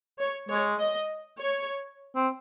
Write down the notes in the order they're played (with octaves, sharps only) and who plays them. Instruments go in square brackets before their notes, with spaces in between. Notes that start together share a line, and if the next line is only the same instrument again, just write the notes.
[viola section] C#5
[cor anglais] G#3 [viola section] C#5
[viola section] D#5
C#5
[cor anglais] C4